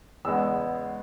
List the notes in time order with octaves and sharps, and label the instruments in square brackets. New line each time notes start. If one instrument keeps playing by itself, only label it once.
[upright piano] E2 C#3 G#3 B3 E6